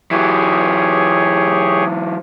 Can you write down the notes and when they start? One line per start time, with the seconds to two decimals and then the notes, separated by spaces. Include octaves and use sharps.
0.11 E3 F#3 G4 G#4 C#5